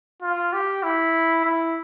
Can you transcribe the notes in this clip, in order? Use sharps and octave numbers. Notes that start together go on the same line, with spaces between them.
F4
G4
E4
E4